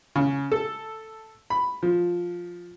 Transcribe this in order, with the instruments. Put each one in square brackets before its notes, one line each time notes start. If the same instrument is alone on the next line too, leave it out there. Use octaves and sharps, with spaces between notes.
[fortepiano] C#3
A4
B5
F3